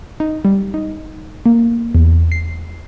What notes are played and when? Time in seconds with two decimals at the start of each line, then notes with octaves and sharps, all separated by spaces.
0.20 D#4
0.45 G3
0.74 D#4
1.46 A#3
1.95 E2
2.32 C7